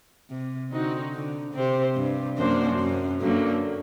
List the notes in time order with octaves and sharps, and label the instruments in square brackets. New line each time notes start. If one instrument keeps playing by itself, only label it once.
[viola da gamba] C3
[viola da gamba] D3 [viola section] C4 D#4 F#4
[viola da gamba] D3
[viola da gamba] C3 [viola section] C4 G4 C5
[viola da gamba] G2
[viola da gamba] F#2 [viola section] A#3 D4 F#4 C5
[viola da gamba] F#2
[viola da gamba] G2 [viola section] D3 F#3 A#3 F#4